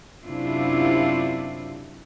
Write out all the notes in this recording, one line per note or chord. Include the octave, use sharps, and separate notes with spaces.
F#2 C3 D4 E4 F4